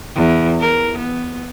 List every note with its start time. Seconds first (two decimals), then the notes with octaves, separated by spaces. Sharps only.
0.16 E2
0.60 A#4
0.98 B3